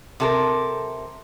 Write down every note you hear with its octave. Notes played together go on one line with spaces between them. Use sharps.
C3 A4 A#4